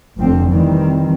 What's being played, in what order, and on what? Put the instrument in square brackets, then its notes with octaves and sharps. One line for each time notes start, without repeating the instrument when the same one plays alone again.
[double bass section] F1 F2 D3 F3 C4
D#3 E3 G3 C4